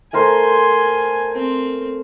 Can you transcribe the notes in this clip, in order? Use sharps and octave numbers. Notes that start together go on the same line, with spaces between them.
A3 A#4 C5 G#5 C6
C4